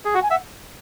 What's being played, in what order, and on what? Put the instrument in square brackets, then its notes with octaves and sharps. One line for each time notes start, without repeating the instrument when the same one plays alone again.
[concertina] G#4
[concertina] F#4 [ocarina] F#5
[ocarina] G#5
[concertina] E5 [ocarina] F#5